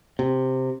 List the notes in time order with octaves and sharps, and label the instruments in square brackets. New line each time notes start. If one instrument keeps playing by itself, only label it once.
[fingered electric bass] C3